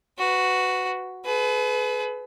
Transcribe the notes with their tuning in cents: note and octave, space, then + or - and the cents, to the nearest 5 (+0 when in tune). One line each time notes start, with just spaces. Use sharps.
F#4 +0 B4 +15
G#4 +45 B4 +20